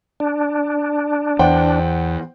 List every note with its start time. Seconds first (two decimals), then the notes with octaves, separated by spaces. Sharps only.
0.20 D4
1.39 E2 C5 F#5 G5